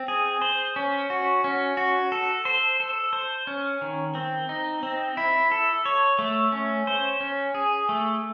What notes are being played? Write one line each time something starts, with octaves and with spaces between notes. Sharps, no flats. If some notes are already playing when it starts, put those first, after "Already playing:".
Already playing: C4
G#4
C5
C#4
F#4
C#4
F#4
A4
C5
A4
C5
C#4
D#3
C4
D#4
C4
E4
A4
C#5
A3
C#4
C5
C#4
G#4
A3